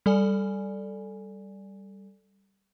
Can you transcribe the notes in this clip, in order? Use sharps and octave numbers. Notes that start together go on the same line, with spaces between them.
G3 A4 D5 G#5